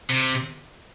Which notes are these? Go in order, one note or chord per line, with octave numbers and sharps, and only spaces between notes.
C3